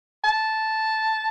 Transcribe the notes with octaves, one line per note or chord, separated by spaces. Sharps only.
A5